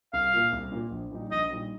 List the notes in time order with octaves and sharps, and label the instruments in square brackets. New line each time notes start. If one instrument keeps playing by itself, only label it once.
[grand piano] C2 [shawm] F5
[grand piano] A#2 A#3 F4
C2
A#2 A#3 F4
A#1
A#2 G3 D#4
[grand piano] A#1 [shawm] D#5
[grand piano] A#2 G3 D#4